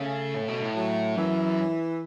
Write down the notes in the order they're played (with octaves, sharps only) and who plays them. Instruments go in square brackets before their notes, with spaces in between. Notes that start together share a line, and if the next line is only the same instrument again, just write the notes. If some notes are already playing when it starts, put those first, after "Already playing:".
Already playing: [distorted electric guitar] C#3 [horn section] A3
[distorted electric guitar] A2
B2
A2
[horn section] F#3
[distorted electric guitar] F#2 [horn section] E3